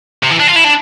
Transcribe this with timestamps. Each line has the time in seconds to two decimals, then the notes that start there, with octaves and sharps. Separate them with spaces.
0.23 C3
0.31 E3
0.40 D4
0.48 F4
0.56 E4
0.64 D4